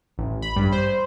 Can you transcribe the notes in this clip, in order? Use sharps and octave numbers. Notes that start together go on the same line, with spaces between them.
A1
B5
G2
C5